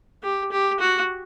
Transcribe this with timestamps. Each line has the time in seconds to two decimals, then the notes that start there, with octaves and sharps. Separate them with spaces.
0.23 G4
0.52 G4
0.80 F#4